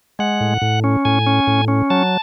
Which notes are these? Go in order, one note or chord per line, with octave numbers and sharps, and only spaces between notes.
G#3 F#5
A2
A2
C#4
A2 G#5
C#4
A2
C#4
F#3 A5